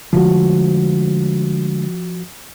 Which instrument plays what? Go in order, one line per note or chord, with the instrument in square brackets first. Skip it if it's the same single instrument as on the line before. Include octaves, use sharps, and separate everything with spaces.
[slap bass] D3 G#3 A3 [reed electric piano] F3 F#4